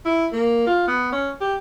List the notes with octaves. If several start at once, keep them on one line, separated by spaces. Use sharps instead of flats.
E4
A#3
F4
B3
C#4
G4